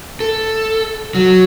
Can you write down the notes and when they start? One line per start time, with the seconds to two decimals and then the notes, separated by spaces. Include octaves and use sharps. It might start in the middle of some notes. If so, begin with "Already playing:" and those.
0.20 A4
1.15 F#3